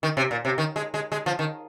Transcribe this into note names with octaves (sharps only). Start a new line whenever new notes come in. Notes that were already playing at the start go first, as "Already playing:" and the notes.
D#3
C3
A#2
C3
D#3
G#3
G#3
G#3
F3
D#3